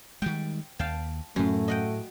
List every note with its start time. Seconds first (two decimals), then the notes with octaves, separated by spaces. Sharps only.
0.22 D#3 G3 G#3 G5
0.79 D#2 F5 G5 A5
1.36 F#2 A2 F#3 A3
1.68 D#5 F#5 G5